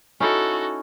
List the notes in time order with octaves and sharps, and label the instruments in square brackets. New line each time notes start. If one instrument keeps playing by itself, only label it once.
[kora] C#4 D#4 E4 [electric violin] F#4 A4